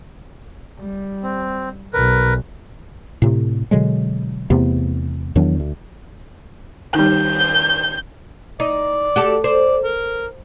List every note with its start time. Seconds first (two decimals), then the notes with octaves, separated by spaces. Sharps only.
0.80 G3
1.23 C4
1.93 B1 A#4 B4
3.22 A2 C3
3.71 B2 D3 F#3 G#3
4.50 E2 C3 A3 B3
5.36 E2 D#3 F#3 D4
5.60 D2
6.94 D#3 G3 G6
8.60 D#4 D5
9.16 F#4 G4 A4
9.44 C5 D5
9.83 A#4